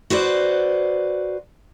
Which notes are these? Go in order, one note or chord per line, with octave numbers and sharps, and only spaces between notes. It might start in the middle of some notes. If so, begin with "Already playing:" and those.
F#4 B4 C5 D5